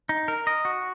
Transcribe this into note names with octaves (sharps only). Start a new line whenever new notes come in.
D#4
A#4
D#5
F#4